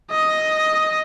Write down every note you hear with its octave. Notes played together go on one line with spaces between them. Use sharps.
D#5